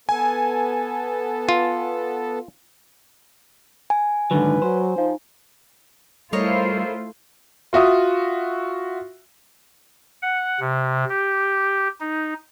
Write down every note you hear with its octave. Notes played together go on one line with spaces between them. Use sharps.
B3 A4 G#5
F4
G#5
G#2 D3 D#3 F#3 B4
F#3 C5
F3 D#4
G3 A3 E4 F4 A#4 C5 C#5 D#5
F4 F#4 E5 D#6
F#5
C3
G4
D#4